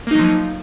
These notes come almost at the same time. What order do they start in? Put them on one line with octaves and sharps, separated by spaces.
A#3 D#4 F#3 F3